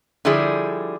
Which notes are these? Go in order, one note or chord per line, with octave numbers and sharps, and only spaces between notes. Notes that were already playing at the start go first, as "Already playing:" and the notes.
D3 F3 G3 E4 G#4